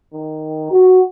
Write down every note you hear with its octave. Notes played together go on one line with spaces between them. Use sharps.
D#3
F#4